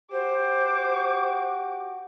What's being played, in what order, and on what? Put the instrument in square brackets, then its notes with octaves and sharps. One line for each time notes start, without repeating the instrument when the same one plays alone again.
[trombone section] F#4 G4 [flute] C5 [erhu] D6